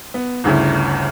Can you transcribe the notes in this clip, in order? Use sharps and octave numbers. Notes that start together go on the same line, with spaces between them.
B3
G1 D2 C#3 E4